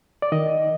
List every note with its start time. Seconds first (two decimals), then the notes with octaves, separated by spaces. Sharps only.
0.22 D5
0.32 D#3 D#5